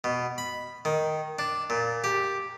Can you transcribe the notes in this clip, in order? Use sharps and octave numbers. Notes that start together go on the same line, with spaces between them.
B2
B5
D#3
D4
A#2
G4